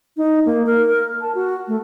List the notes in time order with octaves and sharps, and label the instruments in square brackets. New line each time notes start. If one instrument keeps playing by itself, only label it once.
[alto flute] D#4
A#3
A#4
A5
F#4
A3